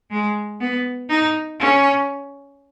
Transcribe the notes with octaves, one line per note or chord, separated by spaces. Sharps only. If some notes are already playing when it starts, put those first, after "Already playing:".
G#3
B3
D#4
C#4